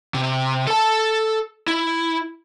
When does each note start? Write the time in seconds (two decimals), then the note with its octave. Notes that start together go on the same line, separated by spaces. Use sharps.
0.14 C3
0.67 A4 A5
1.68 E4